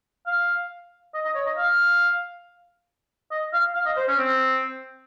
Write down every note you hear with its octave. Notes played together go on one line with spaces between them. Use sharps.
F5
D#5
D#5
C#5
D#5
F5
D#5
F5
F5
D#5
C5
C#4
C4